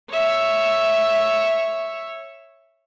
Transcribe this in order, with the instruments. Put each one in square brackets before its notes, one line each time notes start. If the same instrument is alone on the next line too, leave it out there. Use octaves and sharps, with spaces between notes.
[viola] C#5 E5